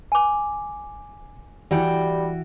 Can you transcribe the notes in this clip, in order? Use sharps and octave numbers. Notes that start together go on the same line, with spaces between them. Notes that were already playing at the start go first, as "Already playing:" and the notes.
G#5 D6
E3 G3 F#4 G5